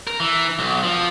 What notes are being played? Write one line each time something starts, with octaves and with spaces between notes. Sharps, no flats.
A#4
E3
B1
F3